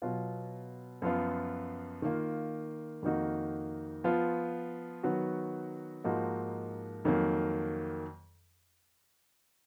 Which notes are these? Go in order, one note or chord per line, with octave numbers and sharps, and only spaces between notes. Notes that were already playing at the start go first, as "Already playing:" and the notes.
B2 F#3 B3 F4
F#2 F3 B3 F4
D#3 A#3 F4
F2 D#3 A#3 D#4 F#4
F3 B3 F4
D#3 F#3 B3 F#4
G#2 F3 A#3 D#4 F#4
F2 D#3 F#3 A#3